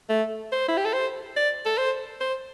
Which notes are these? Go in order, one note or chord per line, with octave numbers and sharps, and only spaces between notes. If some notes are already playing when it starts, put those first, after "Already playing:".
A3
C5
E4
G4
A4
C5
D5
A4
C5
C5